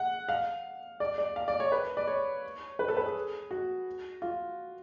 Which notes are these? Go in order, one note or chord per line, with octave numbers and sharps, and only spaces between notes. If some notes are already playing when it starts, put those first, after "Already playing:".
Already playing: F#5
F5
D5
D5
F5
D5
C#5
B4
D5
C#5
B4
A4
B4
G#4
F#4
F4